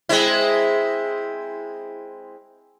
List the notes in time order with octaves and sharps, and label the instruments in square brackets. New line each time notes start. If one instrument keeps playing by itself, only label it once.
[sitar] G#3 C4 E4